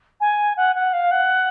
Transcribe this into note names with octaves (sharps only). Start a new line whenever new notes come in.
G#5
F#5
F#5
F5
F#5